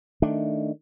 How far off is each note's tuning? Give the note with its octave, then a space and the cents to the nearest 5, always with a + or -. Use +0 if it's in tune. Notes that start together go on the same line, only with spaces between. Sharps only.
D#3 +0 A3 +0 D4 +0